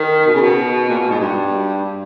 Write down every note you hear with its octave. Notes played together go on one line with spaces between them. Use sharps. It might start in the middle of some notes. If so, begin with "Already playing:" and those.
Already playing: D#3
B2
C#3
B2
A#2
B2
G#2
G2